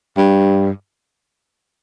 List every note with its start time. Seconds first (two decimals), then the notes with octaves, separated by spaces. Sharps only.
0.17 G2